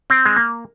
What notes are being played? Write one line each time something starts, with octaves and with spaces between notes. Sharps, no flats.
C4
G#3
A#3